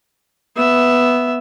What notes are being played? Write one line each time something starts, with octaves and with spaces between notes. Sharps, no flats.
B3 E5